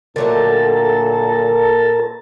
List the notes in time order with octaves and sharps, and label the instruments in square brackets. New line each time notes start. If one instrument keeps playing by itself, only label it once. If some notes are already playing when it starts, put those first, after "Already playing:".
[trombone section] A#2 A4 [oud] D3 F#3 A3 [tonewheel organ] A#4 A5